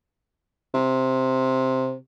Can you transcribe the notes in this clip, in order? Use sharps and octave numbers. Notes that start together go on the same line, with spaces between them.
C3